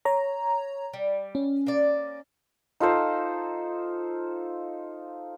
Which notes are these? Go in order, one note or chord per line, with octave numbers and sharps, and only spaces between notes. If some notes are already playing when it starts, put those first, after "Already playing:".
C#5 A#5
G3
C#4
A#3 D5
D#4 F4 A4 C5